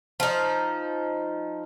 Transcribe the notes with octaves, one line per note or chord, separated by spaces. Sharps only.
F3 D#4